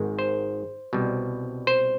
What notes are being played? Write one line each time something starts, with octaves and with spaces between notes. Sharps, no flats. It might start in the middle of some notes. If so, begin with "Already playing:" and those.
Already playing: G#1 G#2 D#3 G#3
C5
C2 B2 G3
C5